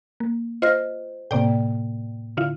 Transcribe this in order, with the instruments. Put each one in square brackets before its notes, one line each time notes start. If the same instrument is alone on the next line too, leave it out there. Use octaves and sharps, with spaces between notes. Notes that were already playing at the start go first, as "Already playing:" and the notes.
[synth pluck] A#3
[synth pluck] F4 C5 [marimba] D#5 F6 A#6
[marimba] A2 A#3 [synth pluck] C3 D5 G5
[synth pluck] D3 E4 F4